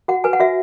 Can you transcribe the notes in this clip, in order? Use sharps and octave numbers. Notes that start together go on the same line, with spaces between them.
F#4 F#5
B4 G#5
F#5
F#4 E5